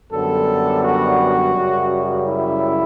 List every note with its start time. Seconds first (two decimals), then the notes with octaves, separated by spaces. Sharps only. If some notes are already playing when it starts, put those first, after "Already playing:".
0.12 F#2 D3 G3 B3 A4
0.84 F#4
1.55 F#2 C#3 G3
2.27 E4